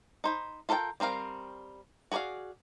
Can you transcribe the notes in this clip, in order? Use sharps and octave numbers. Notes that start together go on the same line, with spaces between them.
D#4 C5 B5
F4 A4 A#4 C#5 G5
G3 C4 A#4 F5
F#4 G#4 B4 D5 F5